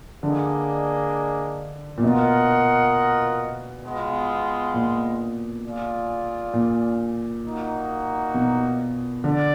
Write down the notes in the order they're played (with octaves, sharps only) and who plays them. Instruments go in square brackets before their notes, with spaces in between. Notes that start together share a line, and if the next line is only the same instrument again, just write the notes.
[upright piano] D3 [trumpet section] A#3 D4 G#4 D#5
[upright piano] A#2
[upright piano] B2 [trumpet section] F4 A#4 D#5 F#5
[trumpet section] G#3 B3 F4
[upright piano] A#2
[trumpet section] F4 G#4 D5 F5
[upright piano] A#2
[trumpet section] A#3 D#4 F#4
[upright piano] B2
[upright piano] D3 [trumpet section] D5